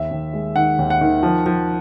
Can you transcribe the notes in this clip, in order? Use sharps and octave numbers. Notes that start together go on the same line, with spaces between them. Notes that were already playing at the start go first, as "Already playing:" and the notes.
Already playing: D#2 E5
D#2
G#3
D#3 F#5
D#2
F#5
D#3
F3
F3